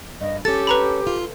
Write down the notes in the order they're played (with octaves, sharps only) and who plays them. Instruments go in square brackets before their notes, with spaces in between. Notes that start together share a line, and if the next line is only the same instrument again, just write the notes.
[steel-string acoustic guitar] G2 [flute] D#5
[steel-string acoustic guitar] C#4 A4 [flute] G4 [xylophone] A6
[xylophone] B4 A#5 B5
[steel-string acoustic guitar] F4